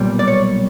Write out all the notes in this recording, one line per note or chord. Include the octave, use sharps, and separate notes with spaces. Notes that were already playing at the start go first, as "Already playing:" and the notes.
Already playing: B1 A#2 G3
D5
C#5